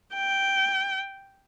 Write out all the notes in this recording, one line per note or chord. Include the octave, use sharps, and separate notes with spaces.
G5